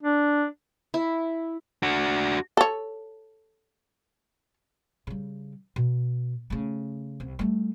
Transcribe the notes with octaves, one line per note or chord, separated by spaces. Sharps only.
D4
E4
D4 F#4
A4 C#5
C#3 G3
B2
C#3 A3
C2
G3 A3